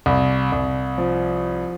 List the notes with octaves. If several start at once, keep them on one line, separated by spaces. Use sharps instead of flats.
C2
C2
F3